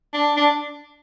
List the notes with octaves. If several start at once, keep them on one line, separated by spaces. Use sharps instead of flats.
D4
D4